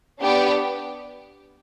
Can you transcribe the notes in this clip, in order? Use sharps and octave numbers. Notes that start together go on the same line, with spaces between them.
B3 D4 G4